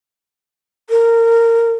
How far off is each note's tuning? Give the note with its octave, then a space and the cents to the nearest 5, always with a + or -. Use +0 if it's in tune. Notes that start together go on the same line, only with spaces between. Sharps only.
A#4 -20